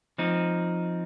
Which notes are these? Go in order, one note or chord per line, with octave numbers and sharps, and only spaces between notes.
F3 C4 D#4